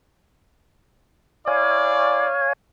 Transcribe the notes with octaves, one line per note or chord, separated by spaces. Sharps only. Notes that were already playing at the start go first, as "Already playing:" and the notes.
E4 C#5 D5 F5 G#5